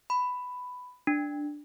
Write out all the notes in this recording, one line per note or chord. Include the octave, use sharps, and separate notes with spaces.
B5
D4